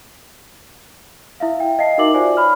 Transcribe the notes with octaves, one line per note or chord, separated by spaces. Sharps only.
E4 E5 F5
G5
D#5 F5 A5 C7
D#4 F#4 A#4 E5 D6 F#7
F4 C5 D5 G#5
C#5 B5 F6